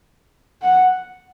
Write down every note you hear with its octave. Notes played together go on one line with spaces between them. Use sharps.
F#5